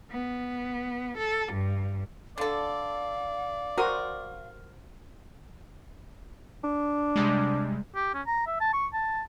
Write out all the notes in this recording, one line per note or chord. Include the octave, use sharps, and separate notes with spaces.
B3
A4
G2
D3 A4 D5 F5
F#4 A#4 C5 D#6
D4
C3 G3 G#3
G4
C#4
A#5
E5
A5
C#6
A5